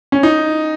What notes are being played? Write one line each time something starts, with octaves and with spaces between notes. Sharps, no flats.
C#4
D#4